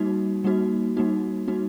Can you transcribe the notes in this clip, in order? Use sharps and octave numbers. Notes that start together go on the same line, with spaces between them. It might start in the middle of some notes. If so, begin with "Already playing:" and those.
Already playing: G3 A#3 D#4 F#4
G3 A#3 D#4 F#4
G3 A#3 D#4 F#4
G3 A#3 D#4 F#4